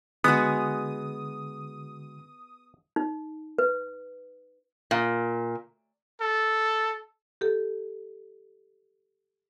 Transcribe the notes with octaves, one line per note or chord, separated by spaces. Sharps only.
D3 G#3 B3 F#4 D#6
D#4
B4
A#2
A4
G4 A4